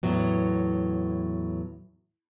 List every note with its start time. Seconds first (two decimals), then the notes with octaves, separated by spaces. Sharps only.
0.03 E2 A2 F#3 B3